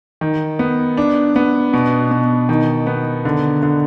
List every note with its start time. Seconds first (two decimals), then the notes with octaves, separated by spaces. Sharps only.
0.21 D#3
0.59 B3
0.97 D4
1.36 B3
1.73 B2
2.11 B2
2.49 D#3
2.87 B3
3.25 D3
3.63 D3